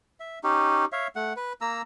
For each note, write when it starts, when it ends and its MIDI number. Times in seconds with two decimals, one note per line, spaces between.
0.20 0.39 76
0.44 0.85 61
0.44 0.85 63
0.44 0.85 67
0.92 1.07 73
0.92 1.07 76
0.92 1.07 77
1.16 1.33 57
1.16 1.33 78
1.36 1.53 71
1.61 1.82 58
1.61 1.82 82
1.61 1.82 88